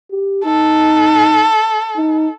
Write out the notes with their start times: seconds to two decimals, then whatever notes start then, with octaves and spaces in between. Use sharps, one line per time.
0.11 G4
0.45 D#4 A4
1.97 D#4